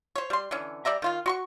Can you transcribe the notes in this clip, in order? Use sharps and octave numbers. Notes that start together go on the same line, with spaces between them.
C5 C#5
G3 C6
D3 E3 C#4
G3 D5 E5 A#5
D#3 F4 F5
F#4 C6 C#6